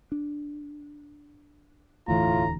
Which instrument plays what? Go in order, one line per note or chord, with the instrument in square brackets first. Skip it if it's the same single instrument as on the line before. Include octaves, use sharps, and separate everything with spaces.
[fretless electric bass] D4
[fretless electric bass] E1 D2 E3 [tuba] A2 [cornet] F4 [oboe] A#5